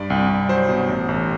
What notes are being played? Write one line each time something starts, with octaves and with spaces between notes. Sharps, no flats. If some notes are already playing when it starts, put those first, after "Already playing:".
Already playing: G2 D5
C2
C2
F#3 C5
B2
A1
A1